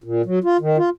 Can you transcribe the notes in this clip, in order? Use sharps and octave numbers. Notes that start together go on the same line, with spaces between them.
A#2
F#3
F4
D#3
F4